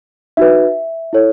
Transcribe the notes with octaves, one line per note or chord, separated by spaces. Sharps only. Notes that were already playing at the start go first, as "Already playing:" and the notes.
D#4 F#4 B4 E5
E4 A4 C#5